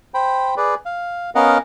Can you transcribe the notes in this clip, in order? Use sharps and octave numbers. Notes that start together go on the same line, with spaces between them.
C5 G5 B5
G#4 B4 D5
F5
B3 C#4 A#4 D#5 F5 F#5